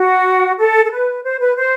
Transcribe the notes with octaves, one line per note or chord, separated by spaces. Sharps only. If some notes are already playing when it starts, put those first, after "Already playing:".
Already playing: F#4
A4
A4
B4
C5
B4
C5